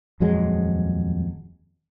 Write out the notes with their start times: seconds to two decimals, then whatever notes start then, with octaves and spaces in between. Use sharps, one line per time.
0.20 D#1 F2 F#3 G#3